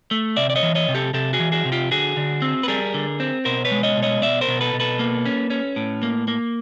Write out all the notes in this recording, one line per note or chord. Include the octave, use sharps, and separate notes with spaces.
A3
C3 D5 E5
D5
C#5 D#5
E3
C#5 D#5
C3
G4 A4
C3 G4 A4
F#4 G#4
E3
F#4 G#4
C3
F4 G4
D3 F#4 G#4
D3
C4
B4
G3 G#4 A#4
D3
C4
B2 A#4 C5
B4 C#5
G#3
C#5 D#5
B2
C#5 D#5
B2 D5 E5
A#4 C5
B2
A4 B4
B2
A4 B4
A#3
C#4
C#4
A2
A#3
A#3